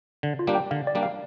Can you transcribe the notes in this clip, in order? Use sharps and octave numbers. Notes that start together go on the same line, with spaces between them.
D3
F4
G3 A#3 D4 G4
G5
D3 F5
D5
G3 A#3 D4 G4
F5